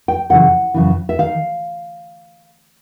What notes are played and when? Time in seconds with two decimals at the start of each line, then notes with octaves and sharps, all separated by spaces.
0.08 G5
0.30 F#2 C#3 E3 F#5
0.74 F#2 C#3 E3
1.09 E5
1.18 D#3 F5